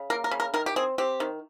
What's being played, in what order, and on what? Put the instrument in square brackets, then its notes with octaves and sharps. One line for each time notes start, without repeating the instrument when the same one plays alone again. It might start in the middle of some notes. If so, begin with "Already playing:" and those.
Already playing: [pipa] C#3
A#3 A#4
A#4
C#3
A#4
D#3 A#4
G4
C4 G#4
C4 G4
D#3